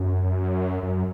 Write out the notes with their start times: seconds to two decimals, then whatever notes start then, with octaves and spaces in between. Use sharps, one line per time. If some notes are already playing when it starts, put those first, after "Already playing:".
Already playing: F#2
0.83 F#2